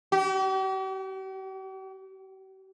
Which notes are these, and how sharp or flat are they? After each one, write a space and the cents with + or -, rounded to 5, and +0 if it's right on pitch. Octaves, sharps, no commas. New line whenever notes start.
G4 -45